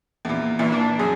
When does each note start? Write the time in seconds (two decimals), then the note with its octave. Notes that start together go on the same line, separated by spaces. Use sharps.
0.25 E2 A#2
0.59 A#2 E3
0.72 D4
0.99 F#2 G#4